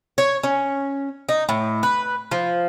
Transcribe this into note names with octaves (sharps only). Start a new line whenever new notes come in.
C#5
C#4
D#4
A2
B4
F3